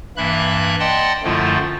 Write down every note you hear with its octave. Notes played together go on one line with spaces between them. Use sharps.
G2 E3 A#3 E5 B5 F#6
D5 D#5 F#5 G5 A5 C6
F#2 D3 F3 A3 E4 F4